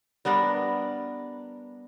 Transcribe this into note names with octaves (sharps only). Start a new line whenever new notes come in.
G3 B3 D4 A#4